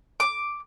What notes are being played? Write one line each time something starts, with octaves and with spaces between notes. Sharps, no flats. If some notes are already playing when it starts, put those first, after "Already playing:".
D6